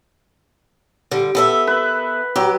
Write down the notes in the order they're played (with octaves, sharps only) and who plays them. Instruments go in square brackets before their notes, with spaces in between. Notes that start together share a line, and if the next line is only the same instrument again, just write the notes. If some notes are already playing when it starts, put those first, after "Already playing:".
[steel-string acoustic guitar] D3 G3
B3 A4 E5
[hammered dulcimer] B4
[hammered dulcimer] F#3 [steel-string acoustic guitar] G4